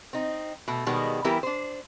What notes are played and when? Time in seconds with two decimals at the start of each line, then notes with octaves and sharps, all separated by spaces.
0.13 C4 D#4
0.68 B2 A3
0.86 B2 D#3 G3 G#3 B3
1.24 E3 G3 B3 E4 G4 A#4
1.43 D4 C5